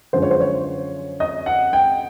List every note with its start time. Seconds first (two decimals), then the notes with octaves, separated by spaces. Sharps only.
0.13 F#2 D3 F3 G#3 C5
0.22 C#5
0.31 C5
0.40 C#5
1.20 D#5
1.46 F#5
1.73 G5